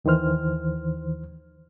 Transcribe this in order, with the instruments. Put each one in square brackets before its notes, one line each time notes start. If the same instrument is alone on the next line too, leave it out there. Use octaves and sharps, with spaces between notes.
[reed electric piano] D#2 D#3 E3 C5 F6